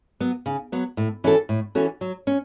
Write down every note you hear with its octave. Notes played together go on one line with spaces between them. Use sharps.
F#3 B3
C#3
F#3 B3
A2
E3 C#4 F#4 A4
A2
E3 C#4 F#4 A4
F#3
C#4